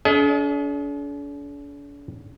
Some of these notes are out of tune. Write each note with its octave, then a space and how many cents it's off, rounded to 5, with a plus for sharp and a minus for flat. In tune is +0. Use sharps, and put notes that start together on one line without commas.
D4 -45 G#4 +45 D#5 +25